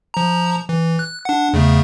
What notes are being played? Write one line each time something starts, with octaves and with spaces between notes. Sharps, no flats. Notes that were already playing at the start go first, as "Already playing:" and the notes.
F3 A#5
E3
F#6
D4 F#5
E2 C#3 A3